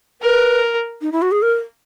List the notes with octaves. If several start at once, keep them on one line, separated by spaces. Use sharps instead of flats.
A#4 B4
D#4
E4
F#4
G#4
A#4